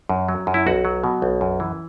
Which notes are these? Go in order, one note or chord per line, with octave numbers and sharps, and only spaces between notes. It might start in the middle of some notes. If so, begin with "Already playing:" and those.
F#2
F#3
F#2
E4
B1 F#4
F#3
B2
B1
F#2
E3